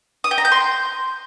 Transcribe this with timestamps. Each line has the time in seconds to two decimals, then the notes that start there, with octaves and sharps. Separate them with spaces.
0.24 D#6
0.31 G5
0.38 A#5
0.45 G6
0.52 C6